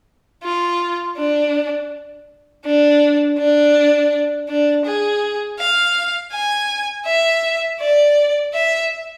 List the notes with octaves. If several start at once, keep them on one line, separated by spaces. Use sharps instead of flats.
F4
D4
D4
D4
D4
G#4
F5
G#5
E5
D5
E5